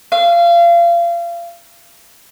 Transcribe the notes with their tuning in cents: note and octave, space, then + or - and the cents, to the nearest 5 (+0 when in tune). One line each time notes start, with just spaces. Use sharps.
F5 -30